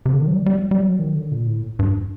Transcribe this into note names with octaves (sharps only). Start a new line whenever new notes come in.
C3
D3
D#3
F#3
G3
G3
G3
F#3
D#3
D3
A#2
A2
G2